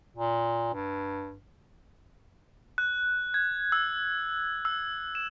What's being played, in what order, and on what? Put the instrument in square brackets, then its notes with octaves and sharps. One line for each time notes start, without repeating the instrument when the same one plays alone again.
[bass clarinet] A#2
G2
[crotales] F#6
G#6
E6
E6
E7